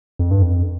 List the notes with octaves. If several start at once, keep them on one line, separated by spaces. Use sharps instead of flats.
F2
G2
F2